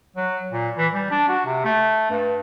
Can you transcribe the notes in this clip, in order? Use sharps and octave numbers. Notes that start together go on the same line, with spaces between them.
F#3
A#2
E3
G3
D4
F#4
C3
A3
G2